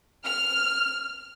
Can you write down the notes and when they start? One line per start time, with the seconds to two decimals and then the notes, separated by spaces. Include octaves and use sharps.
0.25 F6